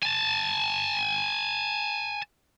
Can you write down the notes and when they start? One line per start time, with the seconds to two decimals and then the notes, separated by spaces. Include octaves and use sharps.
0.03 G#5 A5